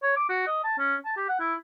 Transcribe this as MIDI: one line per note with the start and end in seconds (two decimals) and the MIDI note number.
0.03 0.15 73
0.17 0.27 86
0.30 0.44 66
0.47 0.61 75
0.64 0.77 81
0.79 0.96 61
1.05 1.15 81
1.17 1.25 67
1.29 1.38 78
1.40 1.54 64